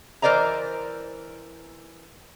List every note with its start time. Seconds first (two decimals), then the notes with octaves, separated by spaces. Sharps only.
0.22 E3 A#4 C5 D5 D#5 A#5